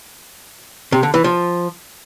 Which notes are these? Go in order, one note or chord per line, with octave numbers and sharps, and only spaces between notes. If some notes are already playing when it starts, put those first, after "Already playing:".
C3
D3
E3
F3